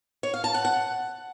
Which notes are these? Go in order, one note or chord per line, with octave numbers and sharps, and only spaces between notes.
C#5
F5
A5
F#5
F#5